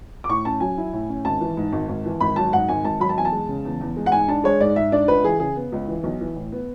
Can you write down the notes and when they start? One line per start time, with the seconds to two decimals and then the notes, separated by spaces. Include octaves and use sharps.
0.24 D6
0.29 A2 C#6
0.45 C#4 A5
0.60 F#3 G#5
0.78 E4
0.93 A2
1.09 C#4
1.25 G#1 A5
1.41 E3
1.57 G#2
1.72 G#1
1.89 G#1
2.05 E3
2.20 G#1 B5
2.36 F#3 A5
2.53 G#2 F#5
2.69 G#1 G#5
2.84 G#1 A5
3.00 F#3 B5
3.09 A5
3.17 E2 G#5
3.25 A5
3.32 G#3
3.48 C#3
3.65 E2
3.81 E2
3.97 G#3
4.06 F#5
4.12 G#2 G#5
4.28 D4 A5
4.44 G#3 C#5
4.60 G#2 D5
4.76 G#2 E5
4.92 D4 D5
5.08 C#2 B4
5.24 E3 G#4
5.40 C#3 G#4
5.56 B3
5.72 C#2
5.88 E3
6.04 B1
6.21 E3
6.36 A2
6.52 B3